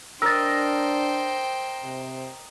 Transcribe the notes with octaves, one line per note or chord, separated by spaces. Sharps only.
D4 A#4 C5 D#5 G5 E6 A6
C3